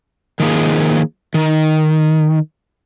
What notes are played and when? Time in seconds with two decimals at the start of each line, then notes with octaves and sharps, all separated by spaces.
0.40 D#3 F3 A#3 G#4
1.34 D#3